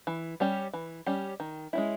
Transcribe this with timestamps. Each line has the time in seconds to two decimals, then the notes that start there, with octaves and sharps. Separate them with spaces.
0.07 E3
0.40 G3 C#4 G4
0.73 E3
1.06 G3 C#4 G4
1.40 D#3
1.73 G#3 C#4 E4